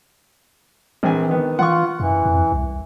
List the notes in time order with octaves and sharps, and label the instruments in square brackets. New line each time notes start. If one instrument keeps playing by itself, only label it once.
[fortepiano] A#1 C4 G#5 [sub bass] E3
[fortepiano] D#3 B3
[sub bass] E3 [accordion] F4 [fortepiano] F#5 C#6
[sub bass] F#2 [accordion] E3
[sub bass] F2
C2